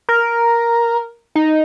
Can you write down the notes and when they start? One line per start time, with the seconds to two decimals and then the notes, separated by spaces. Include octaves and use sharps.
0.09 A#4
1.35 D#4